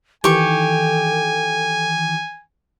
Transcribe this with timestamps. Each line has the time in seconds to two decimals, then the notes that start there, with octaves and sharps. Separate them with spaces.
0.24 D#3 E3 G4 A4 G#5 C#6